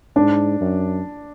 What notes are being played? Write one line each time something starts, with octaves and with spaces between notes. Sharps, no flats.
G#2 D4
F#2